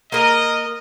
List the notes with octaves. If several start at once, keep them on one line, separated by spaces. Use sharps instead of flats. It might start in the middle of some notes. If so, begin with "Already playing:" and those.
A#3 A#4 D#5